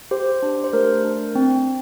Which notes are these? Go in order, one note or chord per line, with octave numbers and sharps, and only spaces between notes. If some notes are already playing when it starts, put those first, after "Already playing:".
G4 C5
D4
C5
A3 A#4
D4
C4